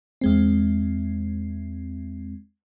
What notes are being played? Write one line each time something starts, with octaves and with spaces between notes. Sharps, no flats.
E2 G#3 C4